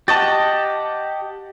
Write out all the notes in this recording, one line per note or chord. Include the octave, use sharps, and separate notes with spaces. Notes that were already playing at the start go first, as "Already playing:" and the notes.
G4 D#5 F#5 A5 C#6 A6